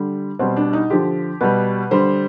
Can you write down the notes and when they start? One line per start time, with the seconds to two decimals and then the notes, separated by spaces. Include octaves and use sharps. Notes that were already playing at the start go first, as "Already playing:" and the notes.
Already playing: D3 G3
0.39 B2 G3 C4
0.57 D4
0.73 D#4
0.90 D3 F3 G4
1.41 B2 G3 B4
1.91 D3 G3 C5